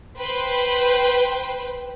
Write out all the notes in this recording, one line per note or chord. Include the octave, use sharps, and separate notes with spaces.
B4 C5 G5